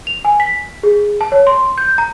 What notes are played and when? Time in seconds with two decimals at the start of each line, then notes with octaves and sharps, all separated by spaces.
0.07 F7
0.25 G#5
0.40 B6
0.83 G#4
1.21 A5
1.32 C#5
1.47 C6
1.78 G6
1.98 A#5